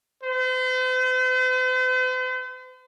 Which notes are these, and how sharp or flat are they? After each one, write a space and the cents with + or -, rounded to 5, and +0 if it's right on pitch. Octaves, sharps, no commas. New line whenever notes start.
C5 -45